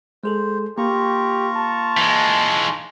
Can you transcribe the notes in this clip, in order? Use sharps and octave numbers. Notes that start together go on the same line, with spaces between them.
G#3 G#4 A4 C5
A#3 F4 G4 A#5 C#6
A5
E3 G#3